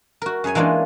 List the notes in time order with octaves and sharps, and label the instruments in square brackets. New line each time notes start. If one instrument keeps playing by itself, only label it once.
[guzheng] F#4 A#4
F#2 G#4 C#5 G#5
E3 G#3 A#3 D4 F4